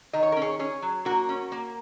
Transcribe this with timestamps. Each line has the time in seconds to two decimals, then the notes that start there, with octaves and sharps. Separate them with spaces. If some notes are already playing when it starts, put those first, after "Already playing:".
0.13 D#3 D#5
0.23 C#5
0.32 A#4
0.36 C#4
0.42 G#4 C#5
0.59 C#4 G#4 C#5
0.82 F#3
1.05 A#3 F#4 A#4
1.29 C#4
1.52 A#3